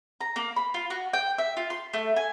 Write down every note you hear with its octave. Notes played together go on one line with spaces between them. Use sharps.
A#5
A#3
B5
F4
F#4
G5
E5
F4
C6
A3
G#5